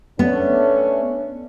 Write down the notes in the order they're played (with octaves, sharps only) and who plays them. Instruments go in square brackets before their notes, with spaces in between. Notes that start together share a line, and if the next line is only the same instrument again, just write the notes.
[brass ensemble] A3 C#4 D4 [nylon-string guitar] B3